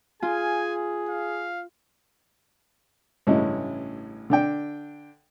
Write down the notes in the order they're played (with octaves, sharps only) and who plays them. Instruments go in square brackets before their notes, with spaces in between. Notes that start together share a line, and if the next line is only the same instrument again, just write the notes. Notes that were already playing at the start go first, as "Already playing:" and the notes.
[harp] F4 [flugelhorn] G#4 [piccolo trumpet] G#5
[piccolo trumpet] F5
[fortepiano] A1 G2 C#3 G#3 C#4 E4
D3 D4 G5